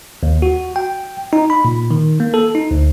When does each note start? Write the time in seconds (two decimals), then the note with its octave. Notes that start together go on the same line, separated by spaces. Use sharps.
0.23 D#2
0.42 F#4
0.76 G5
1.33 D#4
1.50 B5
1.65 A#2
1.91 D#3
2.20 A#3
2.34 A4
2.55 D#4
2.71 D2